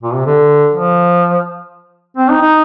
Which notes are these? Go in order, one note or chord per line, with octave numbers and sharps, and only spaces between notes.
A#2
C3
D3
F3
C4
D#4
D#4